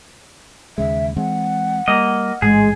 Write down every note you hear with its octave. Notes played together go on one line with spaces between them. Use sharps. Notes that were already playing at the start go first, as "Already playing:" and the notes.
D#2 C#3 G#3 E5
E3 G#3 C4 F#5
G3 A#3 D#5
A1 G#2 G#3 G#4